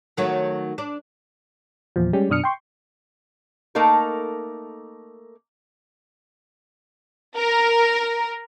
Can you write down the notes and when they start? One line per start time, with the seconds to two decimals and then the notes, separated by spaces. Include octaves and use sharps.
0.17 D#3 F#3 A3
0.78 D4
1.96 E2 A#2 F3
2.13 G3 G#3 C#4 G4
2.29 F#2 B2 D4 D#6 F6 C#7
2.44 G5 C6 C#6
3.75 A3 A#3 D#4 A4 A#4
7.37 A#4